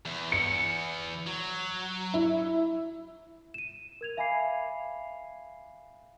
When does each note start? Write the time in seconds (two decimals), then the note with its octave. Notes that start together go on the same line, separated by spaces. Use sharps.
0.06 E2
0.32 C#7
1.27 F#3
2.14 E4
3.54 D#7 E7
4.01 A#4 G#6 F7
4.17 E5 F5 G#5 B5 D6 C7